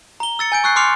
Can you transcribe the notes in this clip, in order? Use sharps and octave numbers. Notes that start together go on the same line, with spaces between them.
A#5 G7
E6 A6 C#7
G#5 G6 D7
C#6 E6 F#6 G6 C7
C6 D6 F6 C7 C#7 F7